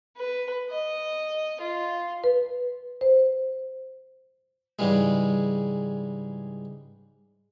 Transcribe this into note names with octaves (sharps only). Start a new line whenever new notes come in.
B4
D#5
F4
B4
C5
G#2 C#3 E3 G3 G#3